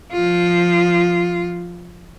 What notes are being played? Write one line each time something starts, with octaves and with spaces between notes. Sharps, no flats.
F3 F4